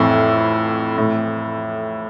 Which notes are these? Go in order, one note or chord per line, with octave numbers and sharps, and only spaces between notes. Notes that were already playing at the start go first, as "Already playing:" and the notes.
Already playing: F2 A2 E3 C4
A2